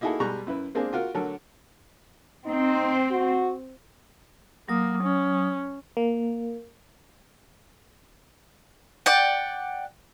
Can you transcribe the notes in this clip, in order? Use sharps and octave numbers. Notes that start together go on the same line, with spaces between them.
A#3 D#4 E4 F#4 G#4 A4
B2 G3 G#3 A#5 C#6 F#6
F#2 E4 B4
G#3 A#3 C4 D4 G#4
F4 F#4 A#4 F5
D3 F#3 A3 A4 A#4
C4 D#4
F#4
F#3 A#3 D#6
C#4
A#3
D5 F#5 G5